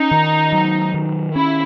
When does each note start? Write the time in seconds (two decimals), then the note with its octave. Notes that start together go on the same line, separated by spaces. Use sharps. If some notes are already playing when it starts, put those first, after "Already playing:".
Already playing: C#4 D#4
0.11 D#3
0.52 F#3
0.94 D#3
1.35 C#4 E4